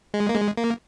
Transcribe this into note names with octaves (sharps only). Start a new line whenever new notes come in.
G#3
A#3
G#3
A#3